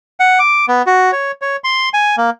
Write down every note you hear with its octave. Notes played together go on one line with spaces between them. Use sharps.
F#5
D6
B3
F#4
C#5
C#5
C6
G#5
A#3